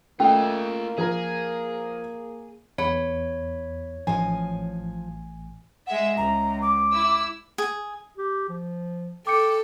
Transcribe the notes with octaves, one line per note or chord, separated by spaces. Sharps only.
A3 A#3 C#4 F4 D#5
F3 G#4 A#4
E2 C#5 F#5 B5
A1 F3 D#5 G#5
G#3 G#4 E5 F#5
C#2 A#5
D6
E4 E6
G#4
G4
F3
A4 G5 D6 C#7